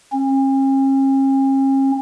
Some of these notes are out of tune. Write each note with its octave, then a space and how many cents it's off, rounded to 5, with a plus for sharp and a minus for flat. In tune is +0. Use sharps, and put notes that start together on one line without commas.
C#4 -45